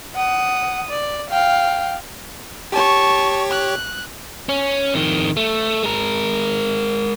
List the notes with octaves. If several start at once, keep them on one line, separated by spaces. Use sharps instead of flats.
F#5 D#6
D5
F5 G5
G4 C#5 A5 C#6
F#6
C#4
F2 D#3
A3
G#3 A#4